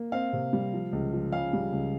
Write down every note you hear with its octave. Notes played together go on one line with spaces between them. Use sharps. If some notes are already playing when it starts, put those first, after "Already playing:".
Already playing: A#3
C4 F5
C3
G3
F3
C#2
F3
C#3 F5
G3
C#2